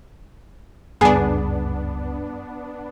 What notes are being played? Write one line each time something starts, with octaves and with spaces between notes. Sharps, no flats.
G1 C#2 F#2 G3 B3 D4 G#4